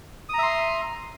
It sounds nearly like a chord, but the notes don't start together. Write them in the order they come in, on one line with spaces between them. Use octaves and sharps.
D#6 A#5 E5 C6